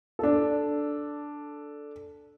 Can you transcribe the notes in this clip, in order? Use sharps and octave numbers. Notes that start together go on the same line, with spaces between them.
D4 A4